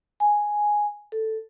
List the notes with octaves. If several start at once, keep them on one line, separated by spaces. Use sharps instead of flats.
G#5
A4